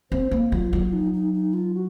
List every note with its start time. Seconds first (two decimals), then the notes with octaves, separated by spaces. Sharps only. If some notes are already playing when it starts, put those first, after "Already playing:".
0.11 C4 C5
0.31 A#3
0.52 F#3 F4
0.72 F#3 F4
0.93 D#4
1.13 D#4
1.33 D#4
1.53 F4
1.74 F#4